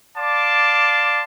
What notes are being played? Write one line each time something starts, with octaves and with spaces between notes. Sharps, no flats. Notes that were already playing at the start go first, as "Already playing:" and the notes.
D5 F5 A5 C6 D6